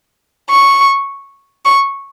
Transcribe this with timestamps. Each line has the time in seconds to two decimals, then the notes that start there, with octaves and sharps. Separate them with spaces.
0.50 C#6
1.65 C#6